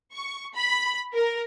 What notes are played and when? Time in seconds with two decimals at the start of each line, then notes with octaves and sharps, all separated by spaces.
0.13 C#6
0.54 B5
1.14 A#4